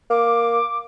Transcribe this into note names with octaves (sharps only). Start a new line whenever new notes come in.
A#3 D6